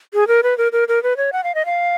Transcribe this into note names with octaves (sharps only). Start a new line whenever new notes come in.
G#4
A#4
B4
A#4
A#4
A#4
B4
C#5
F#5
F5
D#5
F5